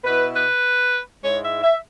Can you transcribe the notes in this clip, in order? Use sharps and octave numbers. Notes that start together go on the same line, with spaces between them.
B2 B3 E4 B4
B4
G#2 G#3 E4 C#5
E5
E5